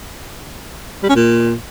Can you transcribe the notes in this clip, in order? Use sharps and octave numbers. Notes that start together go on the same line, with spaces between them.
G3
C#4
A#2